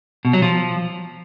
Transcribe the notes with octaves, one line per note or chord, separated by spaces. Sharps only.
B2
F#3
F3